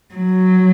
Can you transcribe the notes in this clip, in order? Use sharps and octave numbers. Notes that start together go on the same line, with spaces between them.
F#3